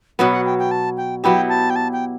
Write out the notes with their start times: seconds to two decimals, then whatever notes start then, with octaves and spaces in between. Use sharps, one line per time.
0.19 B2 F#3 B3 F#5
0.32 F#5
0.45 G5
0.59 G5
0.71 A5
0.97 G5
1.23 F#3 B3 E4 G4 G5
1.49 A5
1.70 G5
1.76 A5
1.93 G5